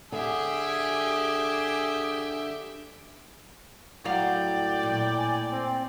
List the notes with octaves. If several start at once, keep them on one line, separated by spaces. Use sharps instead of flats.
D3 G4 G#4 E5
A2 F#3 D5 F5 G5
A#2
G#5
C4